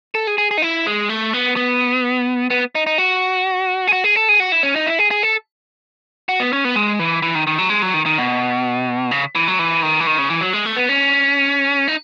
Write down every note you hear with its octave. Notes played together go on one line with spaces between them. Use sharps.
A4
G#4
G#4
G#4
D#4
E4
G#3
A3
B3
B3
B3
D#4
D#4
F#4
G#4
F#4
G#4
A4
G#4
F#4
E4
C#4
D#4
E4
G#4
G#4
A4
F#4
B3
C#4
B3
G#3
E3
E3
D#3
D#3
F#3
G#3
F#3
D#3
D#3
B2
C#3
E3
F#3
E3
D#3
E3
D#3
C#3
E3
F#3
G#3
A3
B3
C#4
D#4